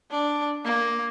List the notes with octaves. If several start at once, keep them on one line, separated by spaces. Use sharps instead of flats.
D4
A#3